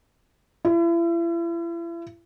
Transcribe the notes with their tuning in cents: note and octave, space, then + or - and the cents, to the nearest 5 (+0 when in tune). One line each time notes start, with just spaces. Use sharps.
E4 +40